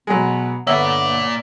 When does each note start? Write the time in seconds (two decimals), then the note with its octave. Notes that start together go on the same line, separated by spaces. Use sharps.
0.07 B2 F#3 G#3 B3
0.67 G2 D3 A#3 B3 C#5 D5 E5 F#5